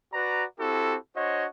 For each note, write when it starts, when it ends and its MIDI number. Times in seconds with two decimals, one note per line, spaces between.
0.13 0.44 66
0.13 0.44 71
0.13 0.44 74
0.13 0.44 82
0.59 0.96 60
0.59 0.96 64
0.59 0.96 66
0.59 0.96 67
0.59 0.96 69
1.16 1.45 62
1.16 1.45 66
1.16 1.45 72
1.16 1.45 73
1.16 1.45 75